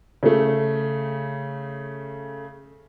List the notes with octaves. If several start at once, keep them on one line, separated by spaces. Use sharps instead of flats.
C#3 A3